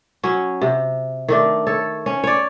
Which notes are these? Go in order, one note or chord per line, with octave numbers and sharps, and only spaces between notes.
F#3 C#4
C3
D#3 A3 D4
A4 C#5
C#4
C#5 D5